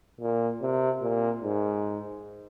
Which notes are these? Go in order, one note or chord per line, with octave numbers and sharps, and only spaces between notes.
A#2
C3
A#2
G#2